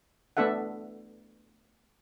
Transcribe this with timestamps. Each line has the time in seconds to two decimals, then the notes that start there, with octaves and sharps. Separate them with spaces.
0.37 A3 B3 D4 A4 E5 F#5